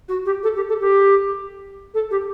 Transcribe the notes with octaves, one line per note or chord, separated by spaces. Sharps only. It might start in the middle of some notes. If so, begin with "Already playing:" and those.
F#4
G4
A4
G4
A4
G4
A4
G4